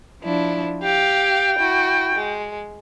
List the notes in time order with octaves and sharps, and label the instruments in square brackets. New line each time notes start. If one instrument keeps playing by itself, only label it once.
[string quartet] F3 D4 E4
[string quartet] G4 F5 [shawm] G5
[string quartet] E4 F#4
G#3